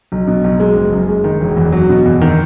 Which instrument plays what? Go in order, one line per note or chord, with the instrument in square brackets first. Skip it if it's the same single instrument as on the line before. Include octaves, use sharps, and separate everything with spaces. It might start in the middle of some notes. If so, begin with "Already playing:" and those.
[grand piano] B1
B2
B1
G#3
F#1
F#2
G#3
D#3
E1
E2
F#3
B2
E2
D#3